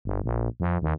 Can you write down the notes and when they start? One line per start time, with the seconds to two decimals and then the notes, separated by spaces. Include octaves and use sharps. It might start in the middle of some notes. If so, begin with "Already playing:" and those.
0.05 G1
0.24 A#1
0.60 F2
0.82 D#2